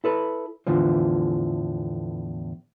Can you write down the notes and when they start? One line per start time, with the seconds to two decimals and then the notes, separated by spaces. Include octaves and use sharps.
0.04 E4 A4 B4
0.67 E2 A2 D3 E3 F3